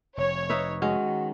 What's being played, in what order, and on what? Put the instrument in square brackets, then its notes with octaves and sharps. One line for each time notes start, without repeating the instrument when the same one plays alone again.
[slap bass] F1 [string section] C#5
[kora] D#4 B4 E5
[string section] D#3 [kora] G#3 C#4 [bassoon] F#4